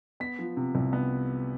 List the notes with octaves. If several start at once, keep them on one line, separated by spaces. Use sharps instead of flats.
B3 B6
F3
C3
C2
B3